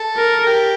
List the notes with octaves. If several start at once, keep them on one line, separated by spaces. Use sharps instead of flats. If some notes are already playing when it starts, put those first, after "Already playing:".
Already playing: A4
A#4
G4